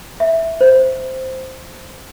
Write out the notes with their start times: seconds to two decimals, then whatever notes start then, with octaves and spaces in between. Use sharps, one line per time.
0.20 E5
0.61 C5